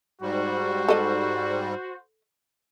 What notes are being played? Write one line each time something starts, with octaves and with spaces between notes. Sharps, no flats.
G#2 G3 F#4 C5
A4 D#5